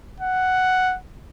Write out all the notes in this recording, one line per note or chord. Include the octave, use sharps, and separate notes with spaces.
F#5